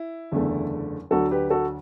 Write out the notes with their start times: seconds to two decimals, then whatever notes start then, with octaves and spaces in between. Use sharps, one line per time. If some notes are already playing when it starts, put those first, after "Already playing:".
Already playing: E4
0.32 F#1 E2 D3 A3
1.11 D2 D3 F#3 F#4 A4
1.31 G4 B4
1.50 F#4 A4